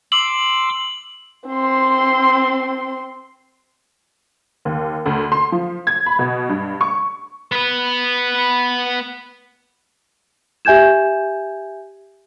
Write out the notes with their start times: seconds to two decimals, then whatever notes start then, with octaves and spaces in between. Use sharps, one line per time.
0.12 C6 D6 E6 F#7
1.48 C4 C6
4.65 D#2
5.06 D2
5.32 C6
5.52 F3
5.87 G#6
6.06 B5
6.19 B2
6.49 G2
6.81 C#6
7.52 B3 B4
10.65 G4 E5 G#5 G6 G#6 E7